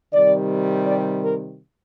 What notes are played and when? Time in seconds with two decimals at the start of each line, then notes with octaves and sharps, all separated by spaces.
0.13 C3 D#3 G3 D5
0.87 D5
1.24 A#4